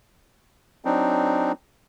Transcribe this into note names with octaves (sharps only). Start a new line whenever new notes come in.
F#3 C4 D4 D#4